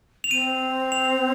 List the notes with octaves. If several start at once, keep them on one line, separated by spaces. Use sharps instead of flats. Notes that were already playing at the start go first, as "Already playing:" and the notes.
F7
C4 D#7
F7